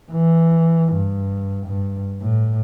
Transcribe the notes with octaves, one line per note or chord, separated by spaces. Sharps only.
E3
G2
G2
A2